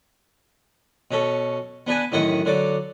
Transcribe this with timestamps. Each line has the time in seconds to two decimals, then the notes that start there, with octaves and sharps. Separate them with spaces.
1.11 B2 C#4 A4
1.87 B3 D4 B4 G#5
2.12 A1 F#2 D#3 E4 D#5 F#5
2.45 D3 F#3 D5 D6